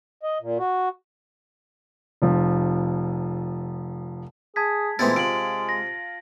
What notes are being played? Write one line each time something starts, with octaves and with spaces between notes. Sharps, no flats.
D#5
A#2
F#4
F1 F3
G#4 A5 G#6 B6
A#2 E3 G#3 A3 B3 C4 E4 A6
C3 F4 D7 F#7
A#6